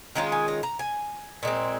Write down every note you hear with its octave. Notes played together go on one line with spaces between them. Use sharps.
D#3 G#3 C#4 F4 A#5
G#5
A#5
A#5
G#5
A#2 G#3 C4